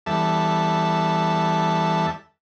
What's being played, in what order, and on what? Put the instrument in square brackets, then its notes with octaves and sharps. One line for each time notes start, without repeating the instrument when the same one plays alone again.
[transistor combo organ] E2 G3 A4 E5 A5